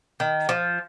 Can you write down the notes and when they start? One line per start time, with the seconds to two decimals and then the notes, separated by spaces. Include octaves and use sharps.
0.20 D#3
0.49 F3